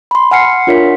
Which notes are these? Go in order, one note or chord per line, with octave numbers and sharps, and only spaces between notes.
B5 C6
F#5 G#5 F6 C7 C#7
D4 F4 A#4 C#5 E5 B6